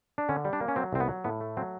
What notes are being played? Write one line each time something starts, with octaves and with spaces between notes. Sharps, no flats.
D4
D3 C#4
G3
D4
A#3
C#4
F#3 C4
C2 C4
B3
F#3
A2 B3
A3
F#3 C4